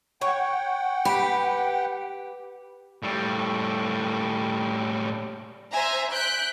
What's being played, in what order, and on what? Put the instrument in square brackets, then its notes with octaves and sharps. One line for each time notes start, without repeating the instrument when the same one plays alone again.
[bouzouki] C#5 [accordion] F#5 G5
[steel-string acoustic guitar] G4 [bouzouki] B4
[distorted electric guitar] A2 G3
[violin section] C5 E5 G#5 A#5
F#6 G6 B6 D7